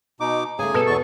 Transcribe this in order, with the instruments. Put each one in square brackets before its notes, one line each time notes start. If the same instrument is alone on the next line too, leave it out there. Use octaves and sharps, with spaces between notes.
[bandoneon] B2 D#4 D6
[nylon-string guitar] C#3 A3 [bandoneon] G#4 G#5
[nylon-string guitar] B2 [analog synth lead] A4
[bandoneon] E2 C#6